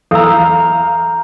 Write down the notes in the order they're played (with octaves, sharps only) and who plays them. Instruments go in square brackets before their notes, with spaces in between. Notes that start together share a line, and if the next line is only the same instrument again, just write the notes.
[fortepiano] E2 [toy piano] A4 E5 E6 [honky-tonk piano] F5 [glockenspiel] A#5 G6